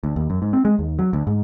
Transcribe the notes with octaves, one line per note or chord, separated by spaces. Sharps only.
D2
D#2
F#2
G#2
C4
G#3
D#2
F#3
D2
G#2